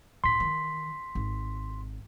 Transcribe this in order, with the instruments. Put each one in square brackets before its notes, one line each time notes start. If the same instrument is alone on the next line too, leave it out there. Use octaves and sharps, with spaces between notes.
[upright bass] C#2 A2 [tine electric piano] C6 B6
[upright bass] D#3 E3
G#1